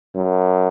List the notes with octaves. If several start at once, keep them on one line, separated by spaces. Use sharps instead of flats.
F#2